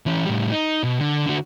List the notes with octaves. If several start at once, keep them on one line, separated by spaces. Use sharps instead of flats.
E3 C#4
A2 G3
D#4
B2
D3
D3 F#4